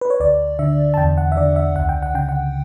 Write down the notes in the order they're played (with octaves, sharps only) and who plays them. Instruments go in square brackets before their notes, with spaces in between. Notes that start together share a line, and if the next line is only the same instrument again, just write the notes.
[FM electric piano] B4
C#5
D2 D5
D3 E5
A5
E2 G5
F#5
E5
D3 D5
E5
C#2 F#5
G5
F#5
C#3 G5
F#5